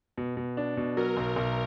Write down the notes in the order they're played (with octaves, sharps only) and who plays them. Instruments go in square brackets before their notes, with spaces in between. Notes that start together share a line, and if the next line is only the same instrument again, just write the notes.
[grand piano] B2
B2
D4
B2
[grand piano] F#3 [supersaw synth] A#4
[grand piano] B1
B1